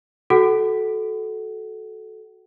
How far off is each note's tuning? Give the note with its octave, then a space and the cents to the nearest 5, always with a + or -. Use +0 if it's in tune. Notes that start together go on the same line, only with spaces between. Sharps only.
F#4 +0 A4 -20 F#5 +30